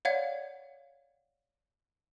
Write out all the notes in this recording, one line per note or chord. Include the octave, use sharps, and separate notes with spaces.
C#5 D5 F5 F#5 G#6